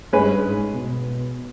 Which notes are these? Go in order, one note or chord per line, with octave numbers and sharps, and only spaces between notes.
G2 G#3 C#4 G#4 B4
G#2
B2